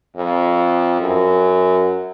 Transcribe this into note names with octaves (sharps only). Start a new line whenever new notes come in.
F2
F#2